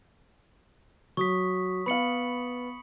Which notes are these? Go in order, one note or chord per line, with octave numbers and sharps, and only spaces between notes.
F#3 C#6 D#6 B6
B3 F5 B5 C#7 F#7